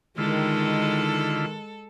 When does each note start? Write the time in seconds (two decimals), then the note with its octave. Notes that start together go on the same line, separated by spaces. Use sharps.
0.18 D3 D#3 G#3 E4 F4 A4